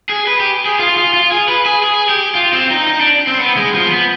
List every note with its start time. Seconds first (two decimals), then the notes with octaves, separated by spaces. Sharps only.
0.09 G#4
0.27 B4
0.40 G4
0.66 G#4
0.79 F4
0.97 F4
1.13 F4
1.32 G#4
1.48 B4
1.65 G#4
1.83 G#4
2.09 G4
2.35 F4
2.53 C4
2.71 D#4
2.87 D#4
3.00 D4
3.27 C4
3.39 B3
3.57 G#3
3.74 F3
3.92 B3